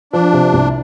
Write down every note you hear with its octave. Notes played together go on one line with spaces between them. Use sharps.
F3 D4
C3
C2